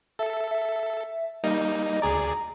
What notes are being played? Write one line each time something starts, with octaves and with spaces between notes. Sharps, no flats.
A4 E5
E5
G3 A#3 D#4 D#5
D2 G#4 D5 A#5